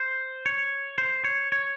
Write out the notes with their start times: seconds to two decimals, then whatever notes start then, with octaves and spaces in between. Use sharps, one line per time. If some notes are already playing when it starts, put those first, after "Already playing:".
Already playing: C5
0.46 C#5
0.98 C5
1.24 C#5
1.52 C#5